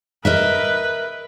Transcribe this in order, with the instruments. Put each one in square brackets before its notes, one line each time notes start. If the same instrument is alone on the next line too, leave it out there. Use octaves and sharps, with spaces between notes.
[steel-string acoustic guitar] A#4 D#5 E5 [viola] B4